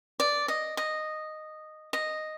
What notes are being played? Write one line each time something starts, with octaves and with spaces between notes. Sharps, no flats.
D5
D#5
D#5
D#5